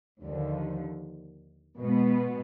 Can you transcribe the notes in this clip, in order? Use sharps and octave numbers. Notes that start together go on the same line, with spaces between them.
D#2 D3 F3
B2 G#3 B3